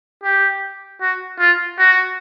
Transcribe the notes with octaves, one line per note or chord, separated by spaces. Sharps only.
G4
F#4
F4
F#4